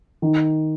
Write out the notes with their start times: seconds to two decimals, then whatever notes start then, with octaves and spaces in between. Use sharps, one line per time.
0.22 D#3